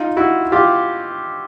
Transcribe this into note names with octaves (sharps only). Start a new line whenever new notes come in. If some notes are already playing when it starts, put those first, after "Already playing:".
Already playing: D#4 F4
E4 F#4
F4 G4